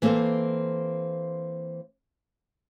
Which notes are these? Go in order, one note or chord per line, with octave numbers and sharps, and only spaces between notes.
E3 A#3 C4 A4 C5